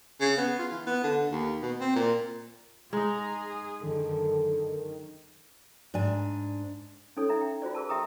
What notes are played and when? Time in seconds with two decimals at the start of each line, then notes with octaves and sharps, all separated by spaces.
0.21 C#3
0.37 B3
0.59 F4
0.72 E3
0.87 B3
1.03 D3
1.32 D#2
1.62 B2
1.80 C4
1.96 A#2
2.93 G#3 D#4 G#4 A#5
3.83 F#2 D3 D#3 A4
5.94 G#2 D4 G#5
7.17 C#4 D#4 A4 C#5
7.29 D#4 E5 A#5
7.41 G5
7.62 F4 F#4 C5 D5
7.75 G#4 A#4 A5
7.89 G4 E5 G5 A#5 D#6